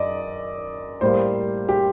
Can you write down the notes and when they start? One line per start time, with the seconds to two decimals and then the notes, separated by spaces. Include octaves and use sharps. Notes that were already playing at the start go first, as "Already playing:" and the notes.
Already playing: F#2 D5 D#5
1.01 A2 G3 A#3 C5
1.69 G4